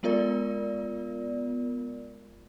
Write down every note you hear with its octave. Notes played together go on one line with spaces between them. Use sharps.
G#3 B3 F4 A#4 D5